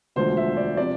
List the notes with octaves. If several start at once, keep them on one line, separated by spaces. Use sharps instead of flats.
E1 D2 D3 F3 C5
E5
D5
C3 F3 D5